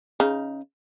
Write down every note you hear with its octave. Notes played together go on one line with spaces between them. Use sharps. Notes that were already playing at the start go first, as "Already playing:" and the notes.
C#3 D#4